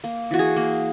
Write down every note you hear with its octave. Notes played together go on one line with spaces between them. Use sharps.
A#3
E3 F#4
G#4
A#3